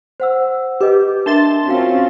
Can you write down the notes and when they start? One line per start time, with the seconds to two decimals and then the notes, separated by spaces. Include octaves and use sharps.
0.20 C5 F#5 E6
0.81 G4 B4 D#5
1.26 D4 A#4 E5 A5 C6 A6
1.68 C4 C#4 F4 F#4 F5